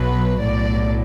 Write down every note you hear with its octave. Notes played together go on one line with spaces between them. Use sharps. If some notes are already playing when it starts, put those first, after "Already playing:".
Already playing: B1 B2 F#3 B4
B1 A2 F#3 D5